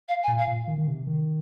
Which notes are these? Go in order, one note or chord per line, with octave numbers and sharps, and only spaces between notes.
F5
G#5
A#2
F5
A#2
D#3
D#3
C3
D#3